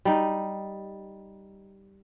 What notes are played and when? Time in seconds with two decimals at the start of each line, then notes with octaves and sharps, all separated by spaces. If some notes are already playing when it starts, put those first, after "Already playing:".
0.05 G3 D#4